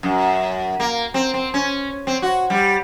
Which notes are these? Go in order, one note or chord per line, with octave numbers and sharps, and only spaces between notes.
F#2
A#3
C4
C4
C#4
C4
F#4
G3